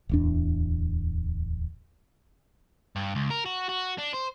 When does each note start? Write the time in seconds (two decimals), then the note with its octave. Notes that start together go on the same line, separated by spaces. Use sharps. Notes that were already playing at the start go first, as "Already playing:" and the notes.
0.09 D1 E2 D4
2.96 G2
3.15 C#2
3.30 A#4
3.45 F#4
3.69 F#4
3.98 D4
4.14 C5